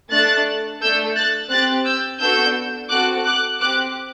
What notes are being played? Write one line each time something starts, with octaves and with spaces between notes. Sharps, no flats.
A3 D4 A4 F#6 A6
A3 D4 A4 E6 G6
F#6 A6
C4 G4 F#6 A6
E6 G6
B3 D4 F#4 A4 E6 G6
C4 F#4 A4 D6 F#6
D6 F#6
C4 G4 D6 F#6